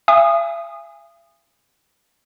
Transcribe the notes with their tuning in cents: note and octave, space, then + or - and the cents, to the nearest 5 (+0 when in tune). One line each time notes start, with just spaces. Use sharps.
E5 +45 G#5 -20 D#6 -15